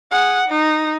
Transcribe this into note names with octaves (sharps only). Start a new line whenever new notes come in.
G#4 F#5
D#4